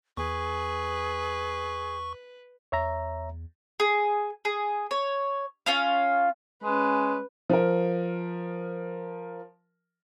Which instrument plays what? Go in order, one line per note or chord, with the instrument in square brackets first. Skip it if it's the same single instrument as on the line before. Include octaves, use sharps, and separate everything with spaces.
[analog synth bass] E2 [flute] G#4 [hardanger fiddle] B4 [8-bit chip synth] C#6
[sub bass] E2 [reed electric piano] C#5 E5 A#5
[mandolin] G#4
G#4
C#5
C#4 F4 F5
[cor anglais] G#3 [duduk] C#4 [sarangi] B4
[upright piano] F3 A#4